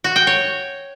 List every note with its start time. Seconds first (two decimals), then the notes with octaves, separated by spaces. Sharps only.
0.04 F#4
0.16 G5
0.27 C#5